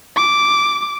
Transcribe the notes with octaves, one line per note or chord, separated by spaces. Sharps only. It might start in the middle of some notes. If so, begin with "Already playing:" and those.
D6